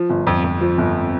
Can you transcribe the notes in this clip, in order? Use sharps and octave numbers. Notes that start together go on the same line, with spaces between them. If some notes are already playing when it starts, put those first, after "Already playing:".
Already playing: F3
G1
F2
F2
F3
G1